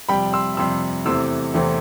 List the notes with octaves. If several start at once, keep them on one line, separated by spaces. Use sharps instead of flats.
F2 C3 G3 G5 B5
C6 E6
F2 C3 G3 C6 E6
E2 C3 E3 A3 C4 C6 E6
E2 C3 E3 A3 C4